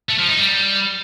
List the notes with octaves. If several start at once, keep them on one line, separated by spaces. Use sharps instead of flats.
A3
F3
D#4
G3